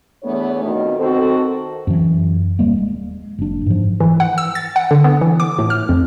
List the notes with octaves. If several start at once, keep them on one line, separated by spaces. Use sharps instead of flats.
E2 A3 B3 D4 C#5
F2 B2 D#3
D#3 C4 F#4 A4
F#2 E3
D#1 G3 A#3
G#3
F#1 D4
G#2 F3
E3
F#5
E6
A6
F#5
D3
B3
E3
D6
A2
F6
F2